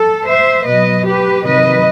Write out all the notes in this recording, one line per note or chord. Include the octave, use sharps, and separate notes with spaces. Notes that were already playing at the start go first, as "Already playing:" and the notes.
Already playing: A4
C5 E5
B2 F#3 B4 D#5
G4 B4
C3 D#3 F#3 B4 D#5